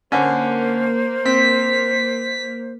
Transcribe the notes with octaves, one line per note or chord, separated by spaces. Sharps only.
D3 A#3 C#4 C5
C4 B6